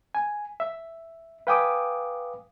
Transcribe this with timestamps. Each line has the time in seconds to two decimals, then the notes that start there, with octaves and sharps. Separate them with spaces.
0.15 G#5
0.60 E5
1.47 B4 F5 G5 G#5 D6 D#6